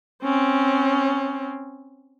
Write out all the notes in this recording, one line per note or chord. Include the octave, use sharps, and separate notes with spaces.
C4 C#4